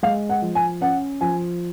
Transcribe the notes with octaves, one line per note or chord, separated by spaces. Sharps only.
G#3 F5
F#5
F3
G#5
C#4 F#5
F3 G#5